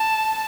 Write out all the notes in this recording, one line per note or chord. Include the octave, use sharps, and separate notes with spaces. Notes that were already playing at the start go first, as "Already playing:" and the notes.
Already playing: A5